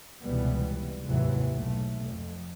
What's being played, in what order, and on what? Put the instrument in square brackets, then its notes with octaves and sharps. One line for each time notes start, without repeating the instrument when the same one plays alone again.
[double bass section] F1 C#2 B2 E3 G3 B3
F1 D#2 G#2 C3 E3 F#3
B1 A3
F2